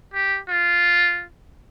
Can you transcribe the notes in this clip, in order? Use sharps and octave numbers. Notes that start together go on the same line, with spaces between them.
G4
F4